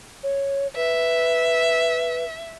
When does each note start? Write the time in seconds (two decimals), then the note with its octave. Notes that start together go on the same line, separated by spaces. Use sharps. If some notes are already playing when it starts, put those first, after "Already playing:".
0.23 C#5
0.76 B4 E5